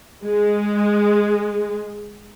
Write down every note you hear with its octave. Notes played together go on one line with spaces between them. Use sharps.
G#3